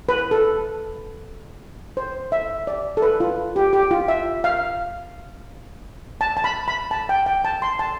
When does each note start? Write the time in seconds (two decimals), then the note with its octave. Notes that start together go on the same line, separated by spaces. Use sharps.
0.09 B4
0.31 A4
1.97 C5
2.32 E5
2.67 D5
2.97 A4
3.02 B4
3.20 F4
3.56 G4
3.73 G4
3.91 F4
4.08 E5
4.44 F5
6.21 A5
6.37 A5
6.44 B5
6.68 B5
6.91 A5
7.09 G5
7.26 G5
7.45 A5
7.62 C6
7.79 A5